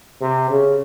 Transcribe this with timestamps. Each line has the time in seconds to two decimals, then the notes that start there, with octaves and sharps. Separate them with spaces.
0.21 C3
0.50 C#3